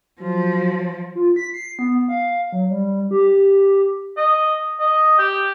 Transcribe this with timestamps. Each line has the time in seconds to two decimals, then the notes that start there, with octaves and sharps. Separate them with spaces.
0.21 F3 F#3
1.15 F4
1.36 B6
1.54 C7
1.79 B3
2.08 F5
2.52 F#3
2.71 G3
3.11 G4
4.17 D#5
4.80 D#5
5.19 G4